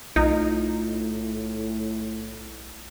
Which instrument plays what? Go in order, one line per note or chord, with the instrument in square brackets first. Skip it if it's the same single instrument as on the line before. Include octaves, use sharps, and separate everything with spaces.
[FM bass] B1 [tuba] A2 [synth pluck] D#4 [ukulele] F4